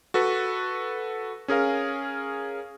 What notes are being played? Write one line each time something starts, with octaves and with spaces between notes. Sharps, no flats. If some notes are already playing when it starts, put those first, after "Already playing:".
F#4 A4 B4
C#4 G#4 A#4 F5